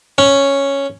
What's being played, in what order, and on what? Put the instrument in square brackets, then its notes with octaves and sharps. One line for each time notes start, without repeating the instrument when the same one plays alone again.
[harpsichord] C#4